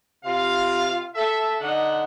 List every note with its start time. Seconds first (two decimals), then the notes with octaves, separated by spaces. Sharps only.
0.25 C3 F4 F5
1.15 A4 E5
1.60 D3 D#4 F#5